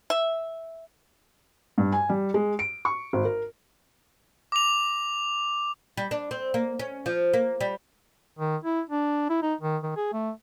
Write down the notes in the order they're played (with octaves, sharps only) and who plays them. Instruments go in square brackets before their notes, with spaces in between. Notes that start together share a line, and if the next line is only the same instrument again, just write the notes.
[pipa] E5
[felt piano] G2
G#5
G3
G#3
D7
C#6
G#1
A#4
[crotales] D6 F7
[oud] G3
D4
C4
A#3
C#4
F3
A#3
G3
[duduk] D#3
E4
D4
E4
D#4
D#3
D#3
G#4
A3